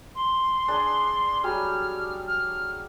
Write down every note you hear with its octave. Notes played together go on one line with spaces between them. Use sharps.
C6
D4 G#4 D5
F#3 G3 G#4 F6
F6